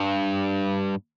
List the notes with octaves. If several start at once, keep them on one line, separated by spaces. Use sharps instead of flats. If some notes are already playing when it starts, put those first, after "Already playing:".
Already playing: G2